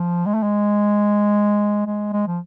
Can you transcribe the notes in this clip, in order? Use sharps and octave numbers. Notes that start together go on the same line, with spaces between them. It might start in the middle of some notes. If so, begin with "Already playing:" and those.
Already playing: F3
G#3
A3
G#3
G#3
G#3
F3